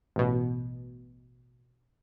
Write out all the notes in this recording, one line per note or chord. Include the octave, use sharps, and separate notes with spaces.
A1 B2